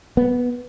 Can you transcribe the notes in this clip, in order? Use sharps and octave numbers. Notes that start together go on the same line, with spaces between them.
B3